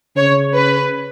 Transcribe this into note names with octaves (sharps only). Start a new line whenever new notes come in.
C#3 C#5
B4